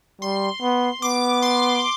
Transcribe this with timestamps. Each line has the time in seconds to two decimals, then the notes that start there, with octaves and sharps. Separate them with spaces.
0.21 G3 C6
0.62 B3
1.02 B3 D6
1.42 C6